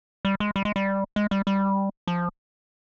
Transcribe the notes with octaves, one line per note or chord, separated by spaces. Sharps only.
G3
G#3
G3
G#3
G3
G#3
G3
G3
F3